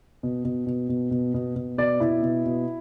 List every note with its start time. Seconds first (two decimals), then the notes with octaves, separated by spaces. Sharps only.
0.23 B2
0.45 B2
0.67 B2
0.89 B2
1.11 B2
1.34 B2
1.56 B2
1.78 B2 D5
2.00 B2 E4
2.22 B2
2.46 B2